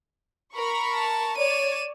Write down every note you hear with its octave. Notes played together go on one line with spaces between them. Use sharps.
A#4 B5 C#6
A5
C#5 D5 D#7 E7